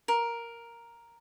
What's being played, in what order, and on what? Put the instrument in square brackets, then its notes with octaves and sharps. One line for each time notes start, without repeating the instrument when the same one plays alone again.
[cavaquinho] A#4